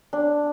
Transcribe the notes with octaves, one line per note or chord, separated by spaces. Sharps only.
D4